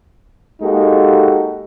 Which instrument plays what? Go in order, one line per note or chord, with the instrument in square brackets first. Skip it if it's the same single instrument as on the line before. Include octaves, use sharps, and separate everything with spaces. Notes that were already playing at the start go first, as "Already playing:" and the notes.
[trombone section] G#3 A#3 D#4 F#4 G4 A4